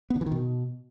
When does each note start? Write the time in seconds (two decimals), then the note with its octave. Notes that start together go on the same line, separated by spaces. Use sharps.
0.10 B3
0.16 D3
0.21 E3
0.26 D#3
0.32 B2